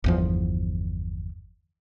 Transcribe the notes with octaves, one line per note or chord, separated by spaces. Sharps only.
G1 E2 F3